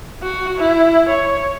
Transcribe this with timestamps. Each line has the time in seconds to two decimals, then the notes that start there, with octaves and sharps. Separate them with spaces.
0.22 F#4
0.58 E4
1.08 C#5